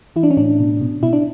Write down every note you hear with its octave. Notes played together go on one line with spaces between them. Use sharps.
E3 E4
D4
C#4
A2 D4
B2
B2
B2 E4
D4